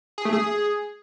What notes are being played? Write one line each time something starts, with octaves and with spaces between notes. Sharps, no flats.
G#4
A3
G#4